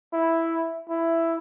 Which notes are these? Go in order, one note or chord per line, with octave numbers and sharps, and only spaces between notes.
E4
E4